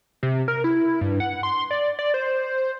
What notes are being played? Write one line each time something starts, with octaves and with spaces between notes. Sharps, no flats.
C3
A#4
E4
G2
F#5
C6
D5
D5
C5